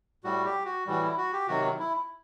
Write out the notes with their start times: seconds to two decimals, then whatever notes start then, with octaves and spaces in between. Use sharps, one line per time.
0.24 A2 G3 F#4
0.45 G4
0.65 F#4
0.86 A2 E3 G3 F#4
1.02 E4
1.18 F#4
1.33 G4
1.47 C3 D#3 F#3 F#4
1.79 E4